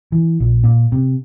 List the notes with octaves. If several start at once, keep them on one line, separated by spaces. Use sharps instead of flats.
E3
A#1
A#2
C3